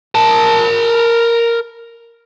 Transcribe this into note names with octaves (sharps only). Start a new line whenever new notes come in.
A#4 A5